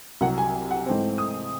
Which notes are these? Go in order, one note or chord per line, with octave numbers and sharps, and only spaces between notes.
C2 C3 F#3 F#5
G#5
F#5
G#2 E3 A3 C4
D#6